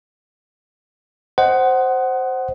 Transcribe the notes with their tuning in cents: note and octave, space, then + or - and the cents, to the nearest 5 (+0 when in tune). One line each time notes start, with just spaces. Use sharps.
C5 +0 D#5 +0 F#5 +20